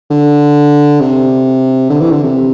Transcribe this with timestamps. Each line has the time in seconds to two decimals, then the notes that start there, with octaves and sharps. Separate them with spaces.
0.11 D3
1.00 C3
1.90 D3
2.01 E3
2.11 D3
2.23 C3